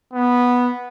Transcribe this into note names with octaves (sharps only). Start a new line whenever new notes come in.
B3